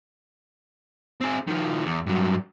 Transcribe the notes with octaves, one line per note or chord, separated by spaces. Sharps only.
C4 G#4
D#3 F3
E2
G2 F#3